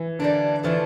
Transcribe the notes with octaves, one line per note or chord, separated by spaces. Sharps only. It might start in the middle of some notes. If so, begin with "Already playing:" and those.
Already playing: E3
D3 G3 A#3 D4
D3 E3 F3 A3 D4